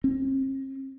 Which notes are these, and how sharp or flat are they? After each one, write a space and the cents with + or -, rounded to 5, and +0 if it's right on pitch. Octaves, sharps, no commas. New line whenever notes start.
C4 +45